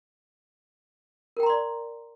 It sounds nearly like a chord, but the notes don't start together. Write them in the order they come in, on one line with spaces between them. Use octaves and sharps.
A#4 G5 A#5 C6 D5